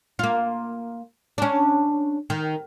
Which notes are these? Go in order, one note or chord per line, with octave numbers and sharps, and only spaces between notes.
A#3 F4
C#4 D4
D#3